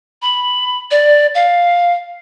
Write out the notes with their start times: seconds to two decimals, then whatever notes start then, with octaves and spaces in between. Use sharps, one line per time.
0.22 B5
0.91 D5
1.35 F5